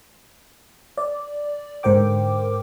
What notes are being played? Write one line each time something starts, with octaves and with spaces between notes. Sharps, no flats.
D5
G#2 D3 A#4 C5 G5 D6